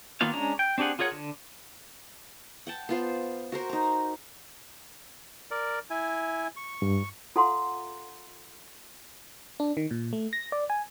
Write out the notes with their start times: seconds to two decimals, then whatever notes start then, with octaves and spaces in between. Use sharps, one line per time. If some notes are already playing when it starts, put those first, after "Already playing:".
0.21 D#3 A#3 B3 F4 F5
0.33 G#3 C#4 D4 A#5
0.59 G5
0.78 C4 D4 G4 G#4 F#5
0.99 F4 G#4 A#4 C#5 F#5
1.12 D3
2.67 F#5 G5 A5
2.89 B3 F4 C5
3.52 F#4 A#4 C5
3.69 D#4 A#5
5.51 A#4 D5
5.90 E4 G#5
6.57 C#6
6.82 G2
7.36 F4 A4 F5 F#5 A#5 C6
9.60 D4
9.77 D#3
9.91 A#2
10.13 A3
10.33 A#6
10.52 D5
10.70 G#5